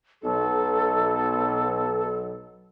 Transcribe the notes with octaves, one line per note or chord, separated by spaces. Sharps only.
B1 A4